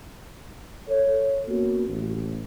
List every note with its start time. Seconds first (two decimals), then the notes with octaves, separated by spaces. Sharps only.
0.88 A4 C#5
1.48 A#3 B3 C#4 F#4
1.88 A1